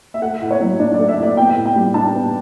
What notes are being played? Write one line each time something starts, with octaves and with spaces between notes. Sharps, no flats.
E5
A3 F#5
A2
C#5
F#3
D4 D5
A3 D5
E5
A2 D5
B3 G5
A2
G5
G3
D4 A5
B3